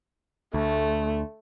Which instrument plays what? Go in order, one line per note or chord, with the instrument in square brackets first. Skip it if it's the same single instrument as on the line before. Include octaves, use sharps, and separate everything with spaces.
[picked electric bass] D2 [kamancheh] A3